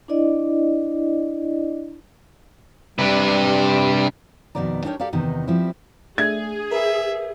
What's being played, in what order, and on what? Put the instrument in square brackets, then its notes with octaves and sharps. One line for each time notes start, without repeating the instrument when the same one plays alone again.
[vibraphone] D4 E4 D5 D#5
[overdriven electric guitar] C3 [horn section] G3 [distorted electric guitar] D4 B4
[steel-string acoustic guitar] F2 B2 D#3 B3 D5 A#5
D4 D#4 G4 A#4 C#5
G4 A4 A#4 D5 F5
E2 C3 D#3 B3 D#4
F3 G3 C4 E4
[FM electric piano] A3 D4 E5 [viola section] G#4 [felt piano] G#6
[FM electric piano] A#4 B4 [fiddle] E5